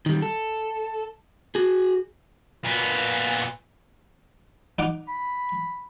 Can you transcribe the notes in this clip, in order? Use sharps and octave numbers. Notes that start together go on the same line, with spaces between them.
D#3 G3
A4
F#4 G#4
A#2 B3
D#4 F#5 D6
B5